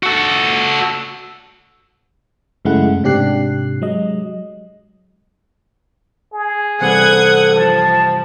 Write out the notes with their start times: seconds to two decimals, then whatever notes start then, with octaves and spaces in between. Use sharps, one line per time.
0.03 F#4 A4
2.65 F#2 C#3 G#3 A3 E4 F#5
3.03 G#2 C3 D4 G4 F#6 C7
3.82 F#3 G#3 D#5
6.34 G#4
6.80 G2 C3 E3 A4 F#5 D#6 G#6
7.55 F3 A5